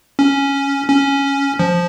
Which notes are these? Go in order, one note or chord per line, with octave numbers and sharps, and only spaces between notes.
C#4
C#4
F3